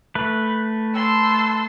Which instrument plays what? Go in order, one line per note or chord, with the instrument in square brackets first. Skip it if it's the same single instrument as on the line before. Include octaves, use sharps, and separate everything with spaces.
[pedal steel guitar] A3 B4
[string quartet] A5 C6 E6